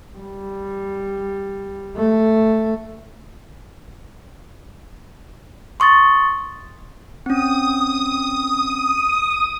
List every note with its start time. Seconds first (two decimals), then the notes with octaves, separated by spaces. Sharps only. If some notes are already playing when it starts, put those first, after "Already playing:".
0.18 G3
1.96 A3
5.80 C6 C#6 D#6 A6
7.26 C4 C#4 D#6